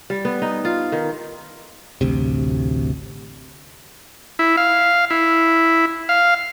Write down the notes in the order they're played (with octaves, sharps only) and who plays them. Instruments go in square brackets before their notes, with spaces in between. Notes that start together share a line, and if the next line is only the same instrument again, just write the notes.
[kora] G3
B3
D#4
F4
D#3
[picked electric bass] A1 D2 C3
[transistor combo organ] E4
F5
E4
F5